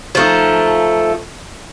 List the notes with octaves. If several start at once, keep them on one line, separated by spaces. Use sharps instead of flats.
F3 A3 D#4